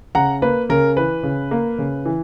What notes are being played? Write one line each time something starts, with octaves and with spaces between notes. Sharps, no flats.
C#3 F#5 A#5
A#3 B4
C#3 A#4
E3 B4
C#3
A#3
C#3
E3